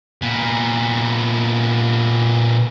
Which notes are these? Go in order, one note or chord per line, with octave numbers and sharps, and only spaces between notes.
A#2 B3